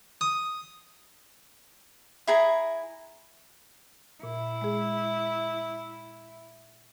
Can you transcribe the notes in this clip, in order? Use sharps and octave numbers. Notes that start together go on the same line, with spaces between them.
D#6
E4 G#4 A#5
A#2 E4
G#3 G#4